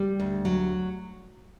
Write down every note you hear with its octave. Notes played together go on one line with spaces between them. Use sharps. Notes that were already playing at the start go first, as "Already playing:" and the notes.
Already playing: G3
D2
F#3